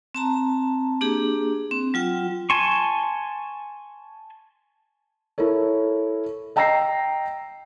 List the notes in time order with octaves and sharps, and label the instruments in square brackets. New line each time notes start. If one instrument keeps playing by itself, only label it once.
[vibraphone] C4 A5 A#5
A#3 D4 G4 G#4
C4
F#3 F4 G5
[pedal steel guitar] G#5 A5 C6 C#6
[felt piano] E4 A4 A#4 C#5
D#5 G5 A#5 E6 A#6 C7